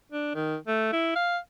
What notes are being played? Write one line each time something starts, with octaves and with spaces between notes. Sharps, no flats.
D4
D#3
A3
E4
F5